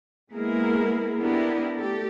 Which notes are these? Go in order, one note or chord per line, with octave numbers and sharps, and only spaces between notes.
G#3 A#3 B3 E4 G#4 A#4
B3 D4 E4 G4 A#4
A3 G4 A4